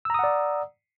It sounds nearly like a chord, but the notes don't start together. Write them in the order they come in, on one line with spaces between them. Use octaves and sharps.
E6 A#5 D#6 F#5 D5